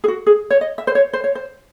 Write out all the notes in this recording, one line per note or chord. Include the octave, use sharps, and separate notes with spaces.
G#4
F#4
G#4
C#5
D#5
E5
C5
C#5
C5
C#5
C5